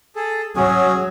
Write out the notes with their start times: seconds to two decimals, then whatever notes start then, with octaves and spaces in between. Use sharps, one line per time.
0.16 G#4 A4
0.56 F#3 C#4 F#4 G#4